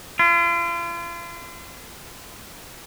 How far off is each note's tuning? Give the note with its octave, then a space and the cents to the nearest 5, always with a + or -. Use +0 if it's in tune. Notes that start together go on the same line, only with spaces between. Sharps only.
F4 -40